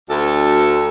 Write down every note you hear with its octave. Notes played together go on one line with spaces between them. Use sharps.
D2 A4